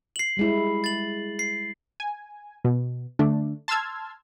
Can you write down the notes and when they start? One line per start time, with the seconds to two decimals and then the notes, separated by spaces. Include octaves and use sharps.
0.16 C7 F#7
0.37 G3 G#3 E4
0.84 A6 F#7
1.39 C7
2.00 G#5
2.65 B2
3.19 D3 A3 D4
3.68 A5 C6 E6 F6 G#6